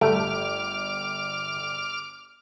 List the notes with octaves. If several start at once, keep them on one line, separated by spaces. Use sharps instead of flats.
G1 A3 G4 D6 F6 D7